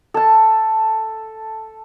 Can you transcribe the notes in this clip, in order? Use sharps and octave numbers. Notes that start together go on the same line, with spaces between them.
A4 A5